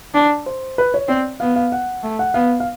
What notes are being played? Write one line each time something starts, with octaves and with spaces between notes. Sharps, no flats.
D4
C5
B4
C#5
C4 D5
B3 F5
F5
F#5
A3
F#5
B3 F5
F5